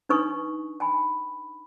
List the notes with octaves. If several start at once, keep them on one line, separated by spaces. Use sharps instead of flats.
D4 D#4 B4 C#6 D#6
G5 G#5 B5